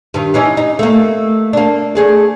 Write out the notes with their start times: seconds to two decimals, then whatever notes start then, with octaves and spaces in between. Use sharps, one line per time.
0.14 G2 D#3
0.34 E3 C#4 D#4
0.57 D#4
0.79 A3 A#3
1.53 A#3 D4
1.95 A3 G#4 D5